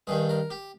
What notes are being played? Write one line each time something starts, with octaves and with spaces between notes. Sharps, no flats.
G2 D#3 G3 G#4
A#4
G4